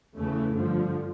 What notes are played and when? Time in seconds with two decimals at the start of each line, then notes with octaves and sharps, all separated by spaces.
0.15 E2 C#3 E3 A3
0.54 G2 D3 F3